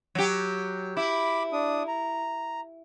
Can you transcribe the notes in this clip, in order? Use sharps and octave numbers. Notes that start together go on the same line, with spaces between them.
F#3 G4
E4 B5 D6
D4 D#6
A#5